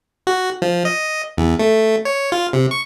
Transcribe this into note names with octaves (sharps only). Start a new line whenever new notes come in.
F#4
F3
D#5
E2
A3
C#5
F4
C3
C#6